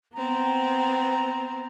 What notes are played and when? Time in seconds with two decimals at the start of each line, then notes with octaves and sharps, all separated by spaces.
0.14 B3 C4 A#5